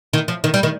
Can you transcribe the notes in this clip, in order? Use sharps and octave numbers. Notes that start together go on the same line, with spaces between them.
D#3
F3
D#3
G3
D#3